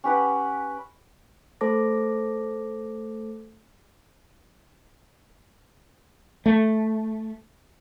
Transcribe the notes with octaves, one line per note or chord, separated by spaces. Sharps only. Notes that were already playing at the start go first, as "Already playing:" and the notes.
C#4 G4 B4 F#5
A3 A4 C5 A5 D6 A#6
A3